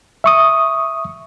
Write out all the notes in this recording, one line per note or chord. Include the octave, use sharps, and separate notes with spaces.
E5 C#6 D#6